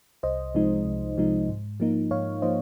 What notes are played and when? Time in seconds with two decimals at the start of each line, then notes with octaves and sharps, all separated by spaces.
0.23 C2 C5 D#5
0.55 C3 F3 G#3 D#4
0.86 C2
1.17 C3 F3 G#3 D#4
1.49 G#2
1.80 F3 A#3 D#4
2.11 G#2 C#5 F5
2.42 F3 A#3 D#4 C5 D#5